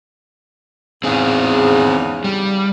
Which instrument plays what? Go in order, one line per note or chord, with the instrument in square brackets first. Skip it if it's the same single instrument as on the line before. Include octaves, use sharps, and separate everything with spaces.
[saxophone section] E2 G#2 C#3 [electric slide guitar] C4 G#4
[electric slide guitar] G3